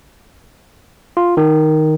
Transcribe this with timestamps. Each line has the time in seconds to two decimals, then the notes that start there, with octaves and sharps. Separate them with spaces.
1.17 F4
1.37 D#3